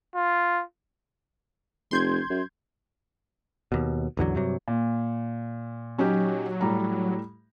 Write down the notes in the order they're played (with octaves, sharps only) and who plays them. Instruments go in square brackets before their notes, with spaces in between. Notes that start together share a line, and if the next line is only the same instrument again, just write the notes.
[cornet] F4
[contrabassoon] F1 [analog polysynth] C6 G6 G#6
[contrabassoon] F#2
[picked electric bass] D#2 B2
A1 E2 D3 F#3
G2 C3 F#3
[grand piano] A#2
[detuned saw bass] F#3 [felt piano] C#4 D#4 G4
[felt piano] A2 G3 A#5